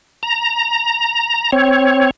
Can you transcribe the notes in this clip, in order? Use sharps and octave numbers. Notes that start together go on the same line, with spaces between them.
A#5
C4 C#5